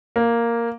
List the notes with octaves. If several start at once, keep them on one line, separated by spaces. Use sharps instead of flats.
A#3